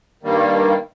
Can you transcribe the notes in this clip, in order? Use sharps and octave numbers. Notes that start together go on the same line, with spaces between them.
G2 D#3 G3 A#3